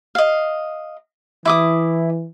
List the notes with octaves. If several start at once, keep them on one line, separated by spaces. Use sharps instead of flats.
D#5 F5
E3 E4 D6 D#6